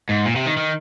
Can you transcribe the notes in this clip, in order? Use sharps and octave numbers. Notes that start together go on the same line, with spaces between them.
G#2
A#2
C3
D#3
D#3